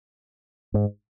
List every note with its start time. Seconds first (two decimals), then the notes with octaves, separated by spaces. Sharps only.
0.74 G#2